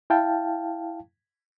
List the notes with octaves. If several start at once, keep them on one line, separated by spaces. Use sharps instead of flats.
E4 F5 G5 A5